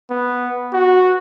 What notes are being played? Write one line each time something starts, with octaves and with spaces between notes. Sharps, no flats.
B3
F#4